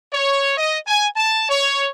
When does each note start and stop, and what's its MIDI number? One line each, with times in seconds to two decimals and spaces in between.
0.13 0.56 73
0.57 0.77 75
0.87 1.07 80
1.16 1.47 81
1.49 1.86 73